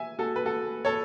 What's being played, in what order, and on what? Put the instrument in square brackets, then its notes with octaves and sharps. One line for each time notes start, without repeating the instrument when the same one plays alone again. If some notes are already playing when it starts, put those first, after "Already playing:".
Already playing: [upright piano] E5 G#5
F#4 A4
B4
F#4 A4
A4 C#5